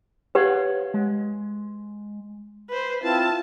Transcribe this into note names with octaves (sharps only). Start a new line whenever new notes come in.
G4 B4 C#5 F5 F#5
G#3
B4 C5
C4 E4 F4 A5